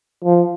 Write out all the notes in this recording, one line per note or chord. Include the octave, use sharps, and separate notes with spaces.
F3